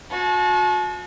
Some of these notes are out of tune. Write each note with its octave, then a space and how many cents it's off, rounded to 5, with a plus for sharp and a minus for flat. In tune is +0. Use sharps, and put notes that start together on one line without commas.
F#4 -35 A5 -40